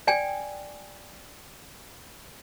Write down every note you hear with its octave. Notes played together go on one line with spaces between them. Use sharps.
D5 G5 G#5